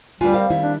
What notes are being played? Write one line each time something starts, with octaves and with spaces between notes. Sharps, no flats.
D2 G3 B3 D4 F4 B4 G#5
D2 C4 A#4 F5
D#3 G3 E4
D4